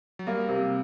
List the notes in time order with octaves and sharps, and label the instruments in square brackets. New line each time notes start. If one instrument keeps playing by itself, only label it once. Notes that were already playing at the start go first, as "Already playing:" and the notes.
[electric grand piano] F#3
[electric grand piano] G3 [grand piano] A#3
[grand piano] C3